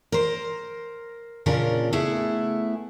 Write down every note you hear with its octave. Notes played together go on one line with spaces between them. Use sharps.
A#4 C5
A#2 C#3 C#4 D4 F4 A#4
A3 B3 E4 G#4